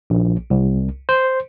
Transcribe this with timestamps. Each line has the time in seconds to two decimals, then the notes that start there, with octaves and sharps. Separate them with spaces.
0.10 A#1
0.50 C2
1.09 C5